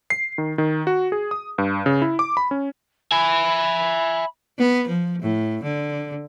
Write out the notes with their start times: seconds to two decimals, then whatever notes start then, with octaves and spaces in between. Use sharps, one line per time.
0.10 C7
0.38 D#3
0.58 D#3
0.87 F#4
1.12 G#4
1.31 D#6
1.58 G2
1.86 C#3
2.02 E4
2.19 D6
2.37 B5
2.51 C#4
3.12 E5 G#5 B5
4.59 B3
4.88 F3
5.22 A2
5.63 D3